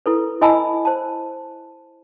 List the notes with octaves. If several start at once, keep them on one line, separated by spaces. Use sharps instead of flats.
E4 A4 B4
E4 D#5 G#5 A5 B5 E6
C5 A5